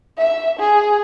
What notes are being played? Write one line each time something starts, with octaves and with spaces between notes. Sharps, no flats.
E5
G#4